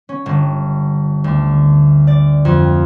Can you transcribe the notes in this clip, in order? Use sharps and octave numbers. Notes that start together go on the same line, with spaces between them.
C#4
G1
D2
D5
F2